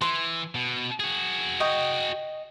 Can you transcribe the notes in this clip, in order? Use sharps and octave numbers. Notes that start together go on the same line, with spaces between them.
E3 C6
B2
F#4 G#4
D#5 G5 C#6